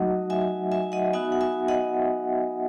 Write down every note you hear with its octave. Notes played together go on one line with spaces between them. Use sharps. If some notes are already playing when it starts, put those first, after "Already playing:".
Already playing: F#3 A3 D#4 F#4 D#5 F#5
E5 G#5
E5 G#5
D#5 F#5
B3 D#4 F#4 E5 G#5
F#5
E5 G#5
D#5 F#5